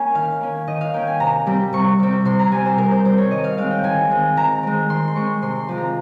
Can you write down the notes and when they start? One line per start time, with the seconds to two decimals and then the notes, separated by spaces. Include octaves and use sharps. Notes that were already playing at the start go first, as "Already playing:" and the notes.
Already playing: A#3 C#4 G#5
0.15 D#3 F5
0.41 A#3 C#4
0.67 D#3 D#5
0.81 F5
0.94 A#3 C#4 G5
1.07 G#5
1.20 C3 A#5
1.46 G3 C4
1.73 C3 C#6
2.00 G3 C4
2.25 C3 C6
2.39 A#5
2.52 G3 C4 G#5
2.65 C5
2.78 C3 A#4
2.91 C5
3.05 G3 C4 C5
3.18 C#5
3.31 D#3 D#5
3.44 F5
3.57 G#3 C4 F5
3.71 G5
3.83 D#3 G#5
4.10 G#3 C4
4.37 D#3 A#5
4.63 G#3 C4
4.89 D#3 C6
5.08 C6
5.15 G#3 C4 C#6
5.42 C3 C6
5.60 C6
5.69 F3 G#3 C4
5.78 A#5